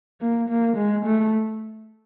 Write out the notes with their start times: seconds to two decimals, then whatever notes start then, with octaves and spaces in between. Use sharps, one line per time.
0.21 A#3
0.49 A#3
0.77 G#3
1.05 A3